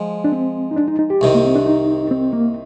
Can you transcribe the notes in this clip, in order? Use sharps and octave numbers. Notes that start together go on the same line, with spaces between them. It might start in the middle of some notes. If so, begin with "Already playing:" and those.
Already playing: F3 G#3
D4
C4
D#4
D4
D#4
D#4
G4
C2 C3 D#3
A#3
C4
D4
D#4
C4
A#3